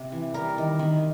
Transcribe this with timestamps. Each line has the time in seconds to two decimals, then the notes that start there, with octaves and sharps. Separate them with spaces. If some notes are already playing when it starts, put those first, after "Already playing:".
Already playing: C3
0.12 E3
0.34 G3 A#4
0.58 D#3
0.79 D#3